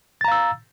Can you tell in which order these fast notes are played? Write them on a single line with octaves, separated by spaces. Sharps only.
A6 A#5 F5 E6